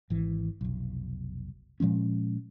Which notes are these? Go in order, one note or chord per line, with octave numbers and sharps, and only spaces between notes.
G#1 E3
F1 B1
A#2 F3 G#3 C#4